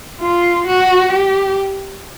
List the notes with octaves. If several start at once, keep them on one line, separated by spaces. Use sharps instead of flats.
F4
F#4
G4